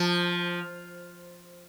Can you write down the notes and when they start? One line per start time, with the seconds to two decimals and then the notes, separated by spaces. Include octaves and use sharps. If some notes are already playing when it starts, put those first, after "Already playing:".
Already playing: F3